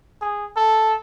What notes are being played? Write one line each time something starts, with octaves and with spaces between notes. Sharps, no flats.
G#4
A4